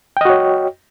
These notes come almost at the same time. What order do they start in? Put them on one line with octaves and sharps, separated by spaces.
G5 D#5 F#4 C#5